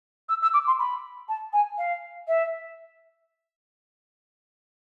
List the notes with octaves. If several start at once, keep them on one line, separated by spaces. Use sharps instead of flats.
E6
E6
D6
C6
B5
A5
G#5
F5
E5